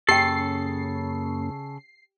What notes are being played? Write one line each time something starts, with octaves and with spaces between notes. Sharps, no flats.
F#2 C#3 A#3 C#4 G4 A4 G5 C7